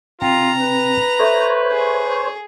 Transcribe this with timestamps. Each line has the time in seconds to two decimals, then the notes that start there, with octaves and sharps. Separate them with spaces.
0.22 C3 F4 G5 A#5
0.59 B4
1.19 A4 C5 C#5 E5
1.71 G#4